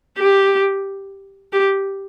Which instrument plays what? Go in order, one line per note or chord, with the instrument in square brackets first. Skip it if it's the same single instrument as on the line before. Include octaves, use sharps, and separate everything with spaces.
[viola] G4
G4